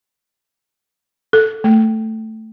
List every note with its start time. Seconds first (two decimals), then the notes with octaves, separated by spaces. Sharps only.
1.33 A4
1.64 A3